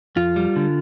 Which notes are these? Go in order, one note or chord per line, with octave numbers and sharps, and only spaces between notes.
F2 F4
G3
D3